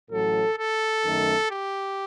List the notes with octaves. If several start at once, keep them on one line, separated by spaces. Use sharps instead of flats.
A1 A2 F#3 A4
A4
F#2 D#3 A3
G4